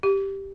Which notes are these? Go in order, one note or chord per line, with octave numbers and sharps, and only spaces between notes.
G4